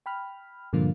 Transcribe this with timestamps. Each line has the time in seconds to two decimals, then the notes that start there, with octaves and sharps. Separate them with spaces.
0.06 G5 B5 F6
0.73 G2 A#2 D3 F3 A#3 F4